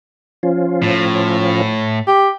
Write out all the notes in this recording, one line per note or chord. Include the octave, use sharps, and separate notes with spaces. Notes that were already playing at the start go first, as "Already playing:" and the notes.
F3 C#4 F4
A2
G4